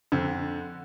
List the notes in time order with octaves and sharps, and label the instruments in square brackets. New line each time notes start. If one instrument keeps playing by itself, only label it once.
[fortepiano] F2 [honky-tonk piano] D3